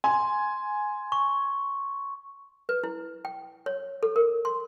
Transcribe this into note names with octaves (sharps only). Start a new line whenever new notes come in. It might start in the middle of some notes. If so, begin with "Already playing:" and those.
G#5 C6
C#6
B4
E4
G5
C#5
A4
A#4
C6